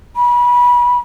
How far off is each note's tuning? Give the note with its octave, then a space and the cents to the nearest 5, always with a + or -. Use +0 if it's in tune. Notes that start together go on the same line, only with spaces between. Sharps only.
B5 -30